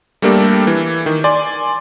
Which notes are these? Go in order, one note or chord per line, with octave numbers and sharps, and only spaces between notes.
G3 A3 A#3 D4 G4 A4
E3
D#3
D5 G#5 C6